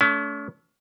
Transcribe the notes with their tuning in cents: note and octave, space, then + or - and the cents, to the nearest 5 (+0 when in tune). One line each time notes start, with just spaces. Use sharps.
A3 -10 C#4 +40